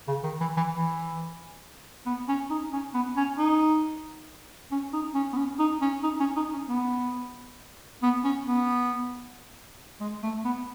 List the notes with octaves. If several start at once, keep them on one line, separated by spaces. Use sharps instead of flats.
C#3
D#3
E3
E3
E3
B3
C#4
D#4
C#4
B3
C#4
D#4
C#4
D#4
C#4
B3
C#4
D#4
C#4
D#4
C#4
D#4
C#4
B3
B3
C#4
B3
G#3
A3
B3